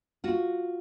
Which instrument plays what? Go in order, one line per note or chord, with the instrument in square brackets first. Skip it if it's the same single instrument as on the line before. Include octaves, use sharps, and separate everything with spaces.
[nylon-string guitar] F4 F#4